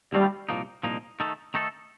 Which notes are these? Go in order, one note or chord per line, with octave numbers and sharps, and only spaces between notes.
D#2 D3 G3 A3 C4 F4
C2 A#2 F3 A#3 D#4
C2 A#2 F3 A#3 D#4
D#3 A3 D#4 A4
D#3 A3 D#4 A4